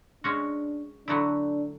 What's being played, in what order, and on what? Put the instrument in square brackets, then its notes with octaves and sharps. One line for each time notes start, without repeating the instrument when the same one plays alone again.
[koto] G#3 C#4 F#4 [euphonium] D4
[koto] D3 F#3 A3 E4 [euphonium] D4